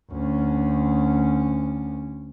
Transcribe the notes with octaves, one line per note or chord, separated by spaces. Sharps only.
D2 C#4